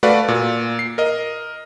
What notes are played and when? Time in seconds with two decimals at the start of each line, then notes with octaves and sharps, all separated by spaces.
0.03 A3 F#4 B4 D5 F5
0.28 A#2
0.79 C7
0.98 A#4 D#5